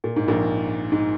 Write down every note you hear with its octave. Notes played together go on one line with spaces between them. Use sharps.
A#2
G#2
A#1 A#2
G#2